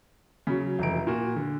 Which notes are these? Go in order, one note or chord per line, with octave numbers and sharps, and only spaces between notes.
C#3 F#3
F1 E3 A#5 D7
A#2 F#4
D3